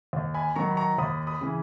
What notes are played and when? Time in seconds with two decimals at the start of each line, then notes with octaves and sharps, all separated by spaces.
0.13 D#2
0.34 G#5 B5
0.56 D#3 F#3 A#5 C#6
0.71 B5
0.77 A#5 C#6
0.98 D#2 B5 D#6
1.27 B5 D#6
1.41 C#3 E3